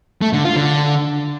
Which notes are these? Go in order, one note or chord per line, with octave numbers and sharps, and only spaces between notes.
A3
D3
F4
D3